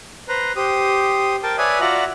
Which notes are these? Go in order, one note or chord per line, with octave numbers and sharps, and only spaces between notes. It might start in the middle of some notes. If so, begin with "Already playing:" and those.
B4 C5 A#5
G4 C5 D#6
A#4 G5 A5
B4 C#5 D5 E5 G#5 D#6
F4 F#4 D5 E5 F#5 A#5